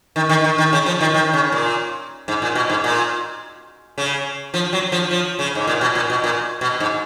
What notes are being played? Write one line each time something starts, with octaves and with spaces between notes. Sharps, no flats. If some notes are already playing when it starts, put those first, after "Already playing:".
D#3
D#3
D#3
D#3
C#3
F3
D#3
D#3
C#3
A#2
G#2
A#2
B2
G#2
A#2
C#3
F3
F#3
F3
F3
C#3
G#2
A#2
B2
A#2
B2
A#2
B2
G#2